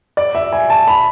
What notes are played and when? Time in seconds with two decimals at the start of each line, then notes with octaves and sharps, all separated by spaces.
0.17 D5
0.35 E5
0.53 G#5
0.70 A5
0.88 B5